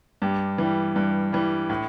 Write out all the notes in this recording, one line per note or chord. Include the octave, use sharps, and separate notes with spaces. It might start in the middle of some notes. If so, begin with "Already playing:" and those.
G2 G4
E3 G3
G2
E3 G3
A2